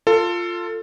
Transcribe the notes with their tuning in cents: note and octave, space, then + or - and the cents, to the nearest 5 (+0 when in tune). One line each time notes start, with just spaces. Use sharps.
F4 +0 A4 +20